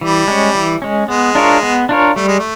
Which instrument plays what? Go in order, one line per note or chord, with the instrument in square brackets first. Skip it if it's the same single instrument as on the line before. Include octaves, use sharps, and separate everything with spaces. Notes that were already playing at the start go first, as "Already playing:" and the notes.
[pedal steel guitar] E3 [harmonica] G3
[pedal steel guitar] G#3 C#4
E3
G#3 C#4
[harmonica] G#3 [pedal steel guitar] B3
[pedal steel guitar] D4 F4 A#4 C#5
B3
D4 F4 A#4 C#5
[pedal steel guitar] G3 [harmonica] A3
[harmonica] G#3
A3